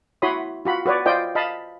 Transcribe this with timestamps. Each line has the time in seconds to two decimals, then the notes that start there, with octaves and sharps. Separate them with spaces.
0.22 E4 F#4 C#5 B5 C6 D#6
0.65 F4 F#4 B5
0.86 F#4 B4 C#5 D5
1.06 F4 C5 D5 D#5 G5
1.35 D#5 F5 A5 B5